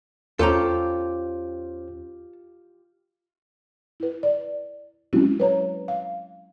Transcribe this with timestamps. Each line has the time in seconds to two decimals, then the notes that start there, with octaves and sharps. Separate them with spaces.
0.39 E2 C#4 F4 G4 A4 C5 A#5
4.00 E4 B4
4.23 D5
5.13 F#3 G#3 C4 C#4 E4 F#4
5.40 B4 C#5 A#5
5.88 F5